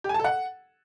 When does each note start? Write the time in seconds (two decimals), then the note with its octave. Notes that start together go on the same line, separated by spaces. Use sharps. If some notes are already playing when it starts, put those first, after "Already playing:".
0.04 G4
0.09 G#5
0.14 A5
0.19 A4
0.24 F#5